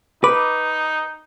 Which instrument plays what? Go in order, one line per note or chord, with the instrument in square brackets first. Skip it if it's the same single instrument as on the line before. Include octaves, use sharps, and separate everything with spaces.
[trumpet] D#4 [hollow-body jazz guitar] B4 [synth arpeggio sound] D6